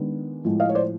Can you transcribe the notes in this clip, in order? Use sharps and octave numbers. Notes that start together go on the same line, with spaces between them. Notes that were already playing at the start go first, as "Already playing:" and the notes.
Already playing: D#3 G#3 B3 D4
A2 F3 G#3
D#5 F5
C#5
C5 D5